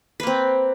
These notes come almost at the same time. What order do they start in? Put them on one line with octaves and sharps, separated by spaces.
B4 A#3 C4